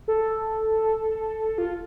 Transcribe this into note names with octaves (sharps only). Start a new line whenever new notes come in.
A4
F4